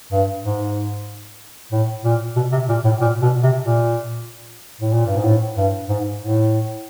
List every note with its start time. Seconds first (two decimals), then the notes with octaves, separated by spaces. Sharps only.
0.12 G2
0.44 G#2
1.72 A2
2.04 A#2
2.36 B2
2.52 C3
2.69 A#2
2.85 A2
3.01 A#2
3.22 B2
3.43 C3
3.64 A#2
4.81 A2
4.93 A#2
5.06 G2
5.16 G#2
5.25 A2
5.57 G2
5.89 G#2
6.21 A2